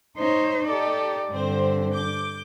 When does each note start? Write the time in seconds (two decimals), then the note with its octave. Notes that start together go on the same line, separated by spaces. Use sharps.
0.18 D#4 C5 C#5
0.68 D#4 G4 A4 D5
1.32 G2 D3 C4 C5
1.93 D6 G6